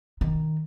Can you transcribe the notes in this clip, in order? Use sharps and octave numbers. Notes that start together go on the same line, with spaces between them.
D#3